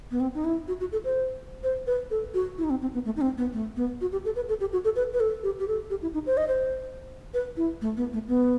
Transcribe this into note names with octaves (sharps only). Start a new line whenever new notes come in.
B3
C4
D#4
E4
F#4
F#4
A4
C5
C5
B4
A4
F#4
E4
D#4
C4
C4
B3
A3
D#4
C4
B3
A3
B3
F#4
G4
A4
B4
A4
G4
F#4
A4
B4
B4
A4
G4
G4
A4
G4
E4
D#4
C5
D#5
C5
B4
E4
A3
B3
A3
B3